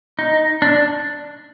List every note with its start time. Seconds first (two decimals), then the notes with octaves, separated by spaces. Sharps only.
0.19 D#4
0.62 D4